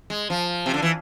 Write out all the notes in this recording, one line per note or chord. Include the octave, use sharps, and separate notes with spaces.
G#3
F3
C3
D3
E3